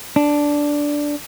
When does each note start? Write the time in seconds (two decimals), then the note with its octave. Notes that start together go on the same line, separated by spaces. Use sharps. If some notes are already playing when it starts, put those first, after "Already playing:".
0.16 D4